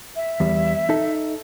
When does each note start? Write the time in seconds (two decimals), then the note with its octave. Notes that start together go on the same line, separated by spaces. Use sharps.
0.16 E5
0.40 E2 G3
0.89 D#4 A4